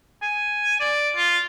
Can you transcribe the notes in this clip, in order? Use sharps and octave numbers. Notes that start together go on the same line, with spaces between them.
G#5
D5
F4